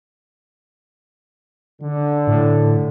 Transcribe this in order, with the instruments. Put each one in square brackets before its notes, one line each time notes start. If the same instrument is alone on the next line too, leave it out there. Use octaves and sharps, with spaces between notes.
[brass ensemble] D3
[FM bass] A2